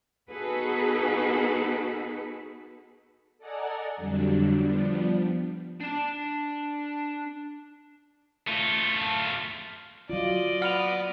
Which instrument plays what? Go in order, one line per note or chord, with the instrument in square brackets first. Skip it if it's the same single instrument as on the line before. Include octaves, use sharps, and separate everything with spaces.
[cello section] B3 D#4 F#4 G#4 A4 B4
[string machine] A4 D5 D#5 F#5 G#5 A#5
F2 D3 F#3 G3 D4
F3 G3 B3 D4
[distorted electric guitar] D4 A5
A3 F4
[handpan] F#3 F4 [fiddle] D5 D#5
[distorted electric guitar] F#5 B5 [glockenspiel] F6 F7